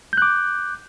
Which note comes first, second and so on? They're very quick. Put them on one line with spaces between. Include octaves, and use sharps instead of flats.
G6 F#6 D6